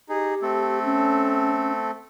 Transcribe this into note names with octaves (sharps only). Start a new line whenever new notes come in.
D#4 G4 G#4
A3 C4 A4
C#4